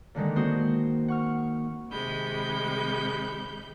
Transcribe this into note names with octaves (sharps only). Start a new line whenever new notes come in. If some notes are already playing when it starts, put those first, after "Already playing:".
A#2 D3 D#3 G#3
A#3 C4 F#4 C5 D#6
F#5 C#6 F6
C3 D#3 G#3 B5 G6